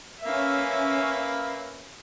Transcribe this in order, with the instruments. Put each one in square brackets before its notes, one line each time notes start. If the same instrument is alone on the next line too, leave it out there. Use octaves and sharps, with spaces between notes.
[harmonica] A#3 B4 F5 [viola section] C#4 E5